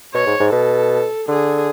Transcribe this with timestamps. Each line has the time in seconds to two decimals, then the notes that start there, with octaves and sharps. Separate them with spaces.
0.14 B2 C#5
0.26 G#2
0.40 G#2
0.52 B2 A4
1.28 D3 G#4